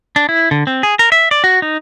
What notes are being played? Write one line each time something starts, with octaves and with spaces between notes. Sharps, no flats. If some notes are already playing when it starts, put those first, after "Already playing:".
D4
E4
D3
C4
G#4
A#4
E5
D5
F#4
D#4